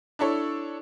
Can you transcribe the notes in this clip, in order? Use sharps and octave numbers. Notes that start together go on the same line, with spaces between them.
D4 E4 A4 C#5